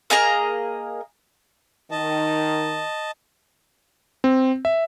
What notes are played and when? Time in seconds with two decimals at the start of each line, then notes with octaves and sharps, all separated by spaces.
0.10 A#3 G#4 D#5 A#5
1.91 D#3 D#5 A5
4.24 C4
4.65 E5